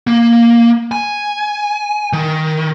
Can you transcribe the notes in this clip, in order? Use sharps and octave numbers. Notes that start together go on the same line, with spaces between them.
A#3
G#5
D#3